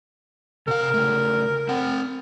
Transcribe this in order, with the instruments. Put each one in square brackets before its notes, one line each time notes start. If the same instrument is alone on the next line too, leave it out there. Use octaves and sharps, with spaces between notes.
[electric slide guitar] C3 F5 [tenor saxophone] A#4
[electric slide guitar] C#3 A3
C4 F#5